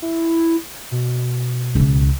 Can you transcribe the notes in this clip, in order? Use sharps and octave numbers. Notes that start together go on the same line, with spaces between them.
E4
B2
C#2 E3